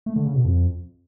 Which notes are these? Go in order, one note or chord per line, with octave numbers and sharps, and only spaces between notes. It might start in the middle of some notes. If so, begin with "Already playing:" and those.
A3
D3
C#3
B2
F2